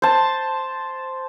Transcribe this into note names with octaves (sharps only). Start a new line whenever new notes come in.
C5 A5